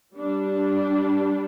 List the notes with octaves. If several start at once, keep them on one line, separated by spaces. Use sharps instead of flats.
G3 D4